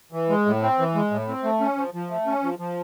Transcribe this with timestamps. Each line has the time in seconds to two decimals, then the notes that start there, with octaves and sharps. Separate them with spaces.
0.12 E3
0.29 G#3
0.46 A2
0.62 C4
0.79 E3
0.95 G#3
1.11 A2
1.28 C4
1.44 A3
1.61 C#4
1.77 F3
1.94 F3
2.10 A3
2.26 C#4
2.43 F3
2.59 F3